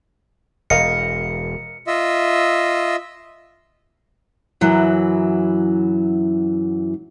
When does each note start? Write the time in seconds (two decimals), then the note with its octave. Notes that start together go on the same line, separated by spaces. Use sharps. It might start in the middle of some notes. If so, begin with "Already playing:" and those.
0.70 E1 A#4 D#5 F5 C#7
1.87 F4 D#5 E5
4.61 F#2 E3 F#3 E4